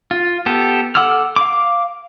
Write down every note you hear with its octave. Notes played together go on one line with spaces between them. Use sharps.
F4
B3 G4 A4
A4 F#5 D6 E6 F6
F5 D6